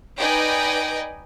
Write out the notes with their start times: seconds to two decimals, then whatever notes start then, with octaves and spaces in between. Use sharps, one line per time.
0.20 D#4 B4 D5 D#5 G5 G#5